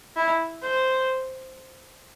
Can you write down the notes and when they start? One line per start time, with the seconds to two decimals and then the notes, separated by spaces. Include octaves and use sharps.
0.17 E4
0.62 C5